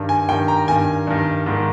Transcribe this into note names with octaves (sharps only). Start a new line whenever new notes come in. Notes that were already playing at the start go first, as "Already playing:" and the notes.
Already playing: G2 D#3
G#5
G2 D#3 G5
A#5
G2 D#3 G#5
G2 D#3
G#2 D#3